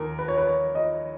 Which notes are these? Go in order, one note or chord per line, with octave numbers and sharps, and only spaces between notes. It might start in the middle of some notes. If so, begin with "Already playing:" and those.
Already playing: D#2 A#4
B4
C#5
B4
C#5
D#5